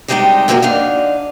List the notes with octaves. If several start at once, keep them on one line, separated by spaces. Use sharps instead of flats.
D2 C3 G3 G#3 D#4 G5
F#2 C3 F3 A#3 F#4 C5
G#2 D3 D4 D#4 F5